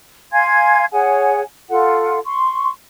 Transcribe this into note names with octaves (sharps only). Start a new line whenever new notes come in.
F5 G#5 C6 G#6
G#4 C#5 F#5 G#5
F4 A4 F#5
C6 C#6